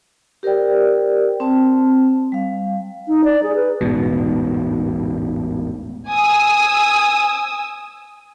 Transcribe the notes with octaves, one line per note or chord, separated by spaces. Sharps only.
G4 A#4 C5 D5 G5
C4 C5 A5
G3 F5
D#4
D5
G#4
B4
E1 A1 G#2 B2
G#5 D#6 E6